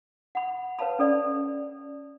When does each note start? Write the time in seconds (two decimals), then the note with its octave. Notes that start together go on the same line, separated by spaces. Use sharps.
0.35 F#5 B5
0.79 B4 C#5 F5 A5 B5
0.99 C#4 A4 D5